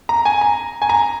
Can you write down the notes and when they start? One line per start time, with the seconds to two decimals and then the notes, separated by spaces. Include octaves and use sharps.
0.09 A#5
0.25 G#5
0.41 A#5
0.82 G#5
0.89 A#5